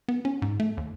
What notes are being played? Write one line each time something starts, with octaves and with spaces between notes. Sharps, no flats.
B3
C#4
G#2
A3
D#2